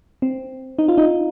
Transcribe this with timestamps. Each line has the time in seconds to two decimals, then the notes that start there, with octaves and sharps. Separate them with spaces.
0.22 C4
0.79 D#4
0.88 F4
0.98 D#4